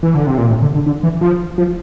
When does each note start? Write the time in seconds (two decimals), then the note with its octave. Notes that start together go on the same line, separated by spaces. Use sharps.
0.03 E3
0.14 D3
0.27 C3
0.38 A#2
0.50 A2
0.62 D3
0.74 D3
0.86 D3
1.03 E3
1.21 F3
1.58 F3